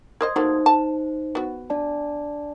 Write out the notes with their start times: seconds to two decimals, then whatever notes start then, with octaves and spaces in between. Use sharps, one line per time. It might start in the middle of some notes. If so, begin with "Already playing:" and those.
0.21 A#4 C5 D#5 C6 D#6 G#6
0.36 F#3 A3 A#3 D#4 C5
0.66 A5
1.35 B3 F#4
1.70 D4 D5 A5